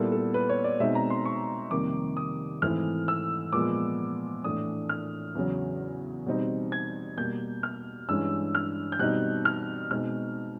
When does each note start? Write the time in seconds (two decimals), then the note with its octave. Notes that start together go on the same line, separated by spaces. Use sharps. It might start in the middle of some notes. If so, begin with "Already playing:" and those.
Already playing: A#2 G3 B3 E4 A4
0.12 A4
0.34 B4
0.49 C#5
0.64 D5
0.80 B2 G#3 C4 D#4 E5
0.95 A#5
1.10 C6
1.25 C#6
1.71 F2 C3 D#3 G3 A#3 D6
2.17 D#6
2.62 G#2 E3 A3 C4 E4 F6
3.08 E6
3.53 A#2 F3 G#3 B3 D6
4.44 A2 E3 A3 D4 D#6
4.89 F6
5.35 E2 C#3 F#3
6.26 B2 G3 C4 D#4
6.72 G#6
7.17 B2 G3 A#3 G6
7.63 F6
8.09 G2 E3 G#3 C#4 E6
8.55 F6
8.92 G6
8.99 B2 G3 C4 D#4 F#6
9.45 F6
9.91 B2 G#3 C4 D#4 F6